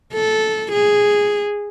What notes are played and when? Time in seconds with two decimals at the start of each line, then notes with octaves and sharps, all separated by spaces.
0.14 A4
0.72 G#4